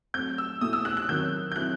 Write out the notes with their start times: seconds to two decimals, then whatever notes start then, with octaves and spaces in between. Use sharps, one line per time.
0.14 F#3 A3 C4 G6
0.38 E6
0.61 B2 A3 E4 D#6
0.73 E6
0.85 F#6
0.97 F#6
1.09 D#3 F#3 C4 G6
1.52 G6
1.56 F#3 C4 E4 F#6